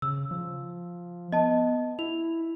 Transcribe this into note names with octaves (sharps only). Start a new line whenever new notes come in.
C#3 E6
F3
B3 D#5 A5
E4 F7